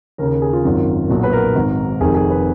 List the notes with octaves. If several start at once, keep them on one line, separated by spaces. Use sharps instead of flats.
D#2 C#3 A#4
A#4
G#4
F4
G#1 F#2 D#3
B1 A#2 F#4
B4
A#4
G#1 G#2 D#3
F1 F2 D#3 G#4
G#4
B4